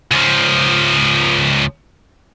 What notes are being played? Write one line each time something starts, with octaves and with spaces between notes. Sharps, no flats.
C#2 F3